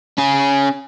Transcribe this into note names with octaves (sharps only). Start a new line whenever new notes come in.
C#4 G#4